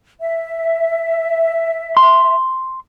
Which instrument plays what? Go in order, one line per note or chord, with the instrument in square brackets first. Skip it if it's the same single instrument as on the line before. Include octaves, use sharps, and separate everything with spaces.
[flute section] E5
[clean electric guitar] C6